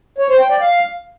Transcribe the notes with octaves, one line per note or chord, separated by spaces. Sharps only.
C#5
C5
G5
D5
F5